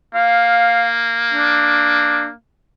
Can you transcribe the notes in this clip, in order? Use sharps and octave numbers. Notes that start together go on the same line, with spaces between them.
A#3 F5
D4